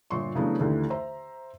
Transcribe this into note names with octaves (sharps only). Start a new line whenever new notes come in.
G1 A#2 C6 C#6
C#3 E3 F#3 A3 B3 D4
D#2 D3 E3 A3
C5 E5 A#5